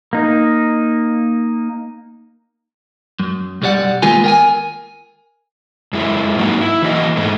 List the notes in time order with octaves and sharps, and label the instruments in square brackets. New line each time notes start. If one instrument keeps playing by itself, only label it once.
[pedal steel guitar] A#3 D#4
[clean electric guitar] F#2
B1 F#2 G3 D5 F#5
D#3 G#3 A#3 B3 F4 G#5
A#4 G5 G#5
[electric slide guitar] F#2 G#3 E4
G#2 F#3 A#3 D#4 F#4
E4
E3 F#3 A#3 F#4 B4 D#5
G#2 G#3 A3